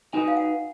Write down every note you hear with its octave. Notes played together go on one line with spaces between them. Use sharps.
D#4 F#4 B4 D#5 G#5
F5
F#5